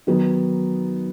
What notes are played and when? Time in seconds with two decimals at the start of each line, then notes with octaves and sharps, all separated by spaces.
0.07 D#3 F#3 B3 D#4